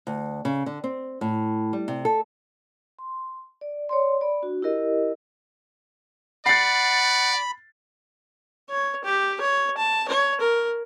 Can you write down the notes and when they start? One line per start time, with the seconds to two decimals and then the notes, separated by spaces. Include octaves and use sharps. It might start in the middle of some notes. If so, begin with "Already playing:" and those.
0.07 D2
0.45 C#3
0.66 D3
0.84 C4
1.21 A2
1.73 G3
1.88 C3
2.05 A4
2.99 C6
3.61 D5
3.89 C#5 D5 C6
4.21 D5 B5
4.42 D4 F#4
4.62 E4 G4 A#4 D#5
6.46 D5 F#5 B5 A6 C7
8.70 C#5
9.04 G4
9.41 C#5
9.77 A5
10.08 C#5
10.40 A#4